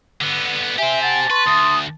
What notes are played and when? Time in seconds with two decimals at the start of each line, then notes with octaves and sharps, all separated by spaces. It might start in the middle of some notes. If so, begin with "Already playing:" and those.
0.21 D3 B3
0.78 G4 C5 E5 G#5
1.03 F#5 A5
1.30 B4 C6 C#6
1.46 D2 D#6